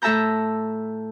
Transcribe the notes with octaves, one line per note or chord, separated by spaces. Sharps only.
A2 A4 E5 A5 A#5 G6